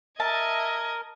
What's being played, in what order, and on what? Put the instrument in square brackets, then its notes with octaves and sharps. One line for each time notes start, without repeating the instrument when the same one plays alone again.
[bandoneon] A#4 [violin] D#5 G#6 [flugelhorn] E5 [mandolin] A5